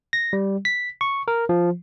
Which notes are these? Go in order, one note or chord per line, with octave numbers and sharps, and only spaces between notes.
A#6
G3
B6
C#6
A#4
F3